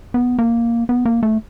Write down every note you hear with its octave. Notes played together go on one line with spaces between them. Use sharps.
B3
A#3
B3
A#3
A3